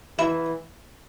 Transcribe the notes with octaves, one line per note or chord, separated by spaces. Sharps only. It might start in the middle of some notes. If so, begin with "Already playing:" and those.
E3 E4